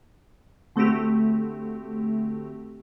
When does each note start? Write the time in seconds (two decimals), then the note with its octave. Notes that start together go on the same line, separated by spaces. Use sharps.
0.76 D3 A3 C4 F#4 G4